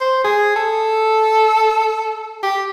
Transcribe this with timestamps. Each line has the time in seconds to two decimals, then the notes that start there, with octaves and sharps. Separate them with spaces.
0.01 C5
0.24 G#4
0.56 A4
2.43 G4